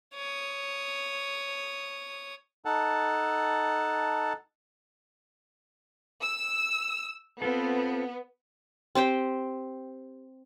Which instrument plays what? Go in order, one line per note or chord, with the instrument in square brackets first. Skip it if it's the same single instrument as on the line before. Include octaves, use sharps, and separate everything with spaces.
[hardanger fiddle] C#5 D#6
[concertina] D#4 A4 F#5 A5
[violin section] E6
[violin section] B3 [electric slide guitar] C4 F4 A4
[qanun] C4 G4 C5 G5